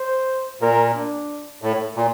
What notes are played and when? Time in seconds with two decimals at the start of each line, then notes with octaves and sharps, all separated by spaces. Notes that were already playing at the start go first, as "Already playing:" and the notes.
Already playing: C5
0.61 A#2 A#4
0.95 D4
1.62 A2
1.96 A#2